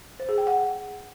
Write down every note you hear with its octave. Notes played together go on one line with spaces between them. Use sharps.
C5
G#4
G5
F#5